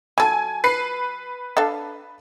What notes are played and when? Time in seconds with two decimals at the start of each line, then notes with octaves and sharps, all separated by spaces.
0.18 F#3 A4 G#5
0.64 B4 B5 C7
1.57 D4 A4 F5